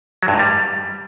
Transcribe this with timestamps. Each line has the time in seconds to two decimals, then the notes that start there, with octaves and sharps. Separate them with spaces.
0.23 F#3
0.28 G2
0.34 G#2
0.39 G3